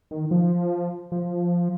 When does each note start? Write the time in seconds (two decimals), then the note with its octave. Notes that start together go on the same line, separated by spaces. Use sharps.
0.11 D#3
0.31 F3
1.12 F3